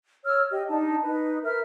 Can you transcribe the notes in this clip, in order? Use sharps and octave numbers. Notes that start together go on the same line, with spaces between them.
C#5 E6 F6
G4 D#5
D4 D#4 A5
D#4 B4
A#4 B4 E5 F6